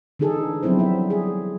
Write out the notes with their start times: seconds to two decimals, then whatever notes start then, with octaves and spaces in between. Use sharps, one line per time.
0.19 D3 E3 D#4 G#4 A4
0.63 F3 F#3 B3 C4 E4 C5
0.79 G3 E5
1.10 G#4